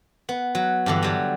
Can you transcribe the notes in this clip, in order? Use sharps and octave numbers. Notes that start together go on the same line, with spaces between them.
B3
F#3
G2 D3 E3
F#3 G3